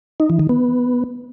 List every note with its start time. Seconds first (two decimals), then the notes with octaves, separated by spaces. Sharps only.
0.20 D#4
0.30 E3
0.39 D#3
0.49 B3